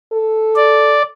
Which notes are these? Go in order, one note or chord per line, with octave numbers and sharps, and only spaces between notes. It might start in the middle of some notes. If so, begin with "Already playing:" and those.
A4
D5